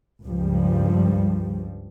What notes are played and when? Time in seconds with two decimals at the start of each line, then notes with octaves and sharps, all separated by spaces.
0.24 C#2 G2 F3 G3